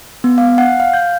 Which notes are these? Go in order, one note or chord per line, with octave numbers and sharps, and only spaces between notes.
B3
F5
F#5
F5
G6